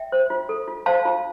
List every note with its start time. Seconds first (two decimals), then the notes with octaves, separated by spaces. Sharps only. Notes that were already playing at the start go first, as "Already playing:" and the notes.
Already playing: E5 G5
0.12 C5
0.30 F4
0.49 A4
0.68 F4
0.86 C5 F5 A5
1.05 F4